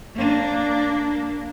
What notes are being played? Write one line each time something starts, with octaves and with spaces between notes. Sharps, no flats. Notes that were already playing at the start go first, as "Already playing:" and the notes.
A#3 D4